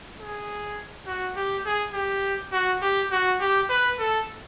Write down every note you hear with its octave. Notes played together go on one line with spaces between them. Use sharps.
G#4
F#4
G4
G#4
G4
F#4
G4
F#4
G4
B4
A4